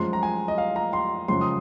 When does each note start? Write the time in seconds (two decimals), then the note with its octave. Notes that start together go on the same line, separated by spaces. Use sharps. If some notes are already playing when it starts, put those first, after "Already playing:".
Already playing: F#2 F3 G#3 C6
0.13 A#5
0.23 G#5
0.48 D#5
0.58 F5
0.76 A#5
0.93 C6
1.28 F#2 C#3 F3 G#3 C6
1.41 D#6